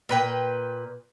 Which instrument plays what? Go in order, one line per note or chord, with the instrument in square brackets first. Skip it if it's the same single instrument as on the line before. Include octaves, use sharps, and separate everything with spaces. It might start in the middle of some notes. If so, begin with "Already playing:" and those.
[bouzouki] A#2 B4 G5